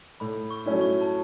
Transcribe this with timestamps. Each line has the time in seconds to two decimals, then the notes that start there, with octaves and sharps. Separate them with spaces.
0.20 A2 B5
0.51 C#6
0.66 F#3 A3 C#4 E4
0.81 C#6
1.01 A5